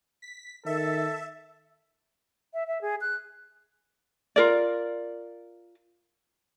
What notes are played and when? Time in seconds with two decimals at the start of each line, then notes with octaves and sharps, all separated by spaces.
0.22 B6
0.66 D#3 A4 E5
2.54 E5
2.67 E5
2.81 G#4
3.01 F#6
4.36 F4 A#4 D5